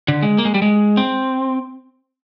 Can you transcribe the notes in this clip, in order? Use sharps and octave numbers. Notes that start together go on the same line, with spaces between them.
D3
G#3
A#3
G#3
G3
G#3
C4